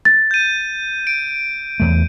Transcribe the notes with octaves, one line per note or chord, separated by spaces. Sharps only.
A6
G6 D#7
D7
E2 A3